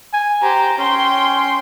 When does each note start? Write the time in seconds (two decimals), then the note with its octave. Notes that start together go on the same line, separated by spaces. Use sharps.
0.13 G#5
0.42 G4 C5 A#5
0.78 C#4 G5 C6